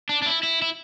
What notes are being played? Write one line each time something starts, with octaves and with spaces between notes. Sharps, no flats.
D4
D4
E4
E4
E4